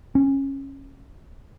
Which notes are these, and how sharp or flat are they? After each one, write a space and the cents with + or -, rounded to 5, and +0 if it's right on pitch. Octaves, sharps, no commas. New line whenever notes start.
C#4 -20